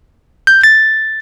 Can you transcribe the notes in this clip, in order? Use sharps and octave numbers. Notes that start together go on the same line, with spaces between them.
G6
A6